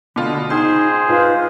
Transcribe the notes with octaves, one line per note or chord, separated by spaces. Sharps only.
B2 D3 F4
C#2 D#4 G#4 C5 C6
G#2 F4 B4